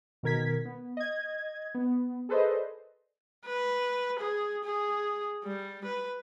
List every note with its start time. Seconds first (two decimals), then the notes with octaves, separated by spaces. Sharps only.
0.23 B2 D#3 A#4 G#6 B6
0.65 B3
0.97 D#5 G#6
1.75 B3
2.29 G#4 A4 B4 C5 D5 D#5
3.46 B4
4.19 G#4
4.64 G#4
5.45 G3
5.85 B4